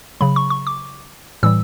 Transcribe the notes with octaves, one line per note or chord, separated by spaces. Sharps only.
C#3 F#3 B5
C#6
C#6
D6
A2 E3 G3 E6